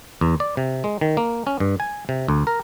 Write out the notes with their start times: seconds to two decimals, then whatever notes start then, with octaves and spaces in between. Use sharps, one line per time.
0.21 E2
0.40 D5
0.57 C3
0.84 G#3
1.01 D#3
1.17 A#3
1.47 C#4
1.60 G2
1.80 G#5
2.09 C3
2.28 D2
2.47 A#4